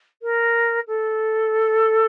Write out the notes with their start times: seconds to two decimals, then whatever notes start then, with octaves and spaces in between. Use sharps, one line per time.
0.22 A#4
0.87 A4